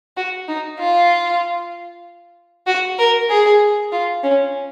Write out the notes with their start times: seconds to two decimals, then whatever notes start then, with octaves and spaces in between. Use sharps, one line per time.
0.17 F#4
0.48 D#4
0.80 F4
2.67 F#4
2.98 A#4
3.30 G#4
3.92 F4
4.23 C#4